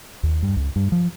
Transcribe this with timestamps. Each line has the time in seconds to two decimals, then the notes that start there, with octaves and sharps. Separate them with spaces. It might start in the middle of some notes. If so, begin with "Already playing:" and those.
0.23 D#2
0.43 G2
0.56 C#2
0.76 G2
0.92 F3